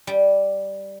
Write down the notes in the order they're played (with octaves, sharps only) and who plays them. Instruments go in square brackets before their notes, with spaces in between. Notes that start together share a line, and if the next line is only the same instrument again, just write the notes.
[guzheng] G3